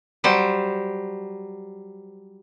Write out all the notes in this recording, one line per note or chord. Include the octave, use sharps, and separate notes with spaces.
F#3 G3 C5